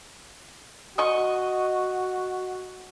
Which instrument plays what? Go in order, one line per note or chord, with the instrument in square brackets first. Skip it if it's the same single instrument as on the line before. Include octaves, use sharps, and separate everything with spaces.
[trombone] F#4 [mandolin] D#5 C#6